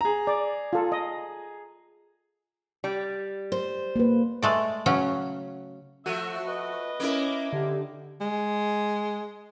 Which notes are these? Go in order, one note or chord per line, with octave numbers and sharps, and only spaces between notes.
G#4 A#5
D5
F4 A4
D#5
G3
C5
A#3 B4
G#3 A3 D5
C#3 F#3 C#4
F3 A3 F#4 E5
B4 D#5
A#3 C#4 E4 A#4 D6
D3 G4
G#3